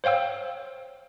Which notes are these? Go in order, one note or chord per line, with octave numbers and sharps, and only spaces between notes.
C5 C#5 F5 G5 E6